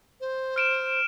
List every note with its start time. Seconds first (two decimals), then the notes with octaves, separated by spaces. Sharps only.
0.21 C5
0.56 F6 D7 E7